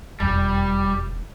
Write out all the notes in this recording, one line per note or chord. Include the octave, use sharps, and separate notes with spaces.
E1 F2 G3